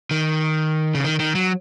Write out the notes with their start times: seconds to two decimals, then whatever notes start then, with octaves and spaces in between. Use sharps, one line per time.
0.11 D#3
0.95 C#3
1.04 D#3
1.19 D#3
1.35 F#3